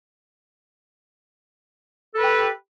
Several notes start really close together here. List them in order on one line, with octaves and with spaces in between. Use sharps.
A4 B4 G4